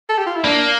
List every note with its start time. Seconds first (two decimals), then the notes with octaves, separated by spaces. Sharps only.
0.09 A4
0.18 G4
0.26 F4
0.36 E4
0.44 A#3 D4